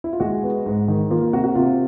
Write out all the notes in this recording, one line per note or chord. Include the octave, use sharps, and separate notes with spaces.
E4
F4
G#3 F#4
B3
G#2
D#3
A#3 F4
F4
C3 F#4
F#4
C3 F4